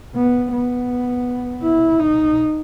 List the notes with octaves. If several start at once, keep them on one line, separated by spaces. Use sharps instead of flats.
B3
B3
E4
D#4